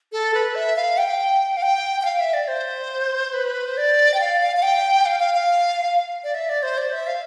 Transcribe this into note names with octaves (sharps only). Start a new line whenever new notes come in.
A4
B4
E5
F5
G5
F5
G5
G5
F5
E5
D5
C5
B4
C5
D5
G5
F5
F5
F5
G5
F5
F5
F5
D5
E5
D5
C5
D5
E5
F5